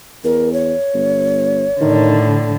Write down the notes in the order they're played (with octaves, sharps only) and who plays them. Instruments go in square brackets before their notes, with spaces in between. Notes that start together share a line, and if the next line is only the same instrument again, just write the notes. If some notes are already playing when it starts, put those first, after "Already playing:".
[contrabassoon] E2 [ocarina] A#4
[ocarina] C#5
[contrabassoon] G1
[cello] A2 D3 [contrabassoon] D#3